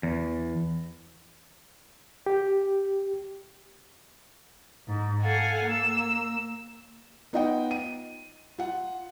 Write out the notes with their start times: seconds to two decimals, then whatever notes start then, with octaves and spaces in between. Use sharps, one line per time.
0.03 E2
2.26 G4
4.88 G#2
5.21 A4 F5 F#5 G#5
5.65 A#3 E6
7.33 B3 D#4 F4 D#5 F#5 G5
7.71 D#7
8.58 F4 F#5